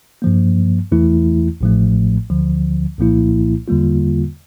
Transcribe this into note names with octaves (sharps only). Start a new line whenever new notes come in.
G2 F3 A#3
E2 E3 A3 E4
A1 A2 F3 A3
D2 D3 F3
C2 A#2 F3 A#3 E4
E2 D3 G3 A#3 F4